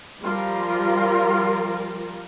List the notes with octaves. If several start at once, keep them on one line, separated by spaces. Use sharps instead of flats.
F3 G3 F4 A#4